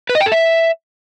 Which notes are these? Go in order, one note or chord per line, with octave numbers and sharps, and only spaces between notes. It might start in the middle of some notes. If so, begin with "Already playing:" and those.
B4
D#5
G5
A4
E5